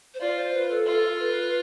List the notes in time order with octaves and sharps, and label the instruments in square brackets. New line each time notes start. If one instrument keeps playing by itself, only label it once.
[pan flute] C5
[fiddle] F4 [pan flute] D5
[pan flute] C5
B4
A4
[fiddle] F4 [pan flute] A4
[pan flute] B4